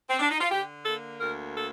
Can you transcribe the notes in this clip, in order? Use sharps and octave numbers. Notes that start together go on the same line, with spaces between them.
C4
D4
D#4
F4
D3 G4
A#3 A4
D2 A#4
A#3 A4